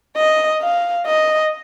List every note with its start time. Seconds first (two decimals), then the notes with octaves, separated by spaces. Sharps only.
0.16 D#5
0.61 F5
1.07 D#5